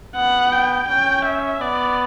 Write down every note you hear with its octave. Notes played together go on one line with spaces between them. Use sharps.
B3 F#5
G5
C#4 G5
E5
B3 D5